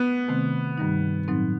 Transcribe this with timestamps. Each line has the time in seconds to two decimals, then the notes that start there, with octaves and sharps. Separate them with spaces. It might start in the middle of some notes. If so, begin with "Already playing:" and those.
Already playing: B3
0.28 C3 D#3 A3 C4
0.78 G2 D#3 G3 D#4
1.28 A2 F#3 C4 D#4